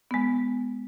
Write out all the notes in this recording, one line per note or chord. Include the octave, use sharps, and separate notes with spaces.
G#3 B3